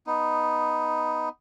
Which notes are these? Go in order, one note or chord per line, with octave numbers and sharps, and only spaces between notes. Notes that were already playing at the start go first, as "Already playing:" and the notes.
B3 D#4